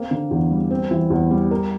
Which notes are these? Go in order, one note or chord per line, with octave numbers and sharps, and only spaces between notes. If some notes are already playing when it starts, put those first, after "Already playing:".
Already playing: A#3 C4
D3
E2
G3
C4
E3
E2
G3
A#4